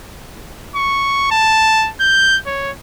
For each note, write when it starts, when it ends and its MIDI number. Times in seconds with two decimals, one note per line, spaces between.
0.76 1.28 85
1.31 1.90 81
2.01 2.38 91
2.46 2.71 73